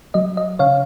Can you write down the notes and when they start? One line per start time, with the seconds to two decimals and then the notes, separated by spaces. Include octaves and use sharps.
0.14 F#3 D#5
0.37 D#5
0.59 C#3 C#5 F5